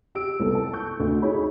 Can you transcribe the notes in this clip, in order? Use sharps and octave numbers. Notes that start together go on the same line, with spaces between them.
G4 E6 D7
C2 B3 A4
A5
C#6 G6
D2
D#4 G#4 C#5 B5